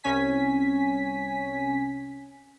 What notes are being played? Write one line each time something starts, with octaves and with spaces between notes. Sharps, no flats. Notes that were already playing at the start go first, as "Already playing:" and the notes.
C2 C#4 G#5 B6